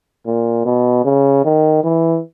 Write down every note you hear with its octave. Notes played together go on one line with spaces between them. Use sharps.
A#2
B2
C#3
D#3
E3